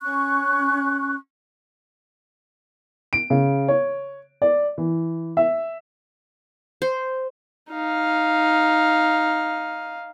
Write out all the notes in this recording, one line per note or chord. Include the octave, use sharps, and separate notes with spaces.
C#4 C#6 F#6
D7
C#3
C#5
D5
E3
E5
C5
D#4 F5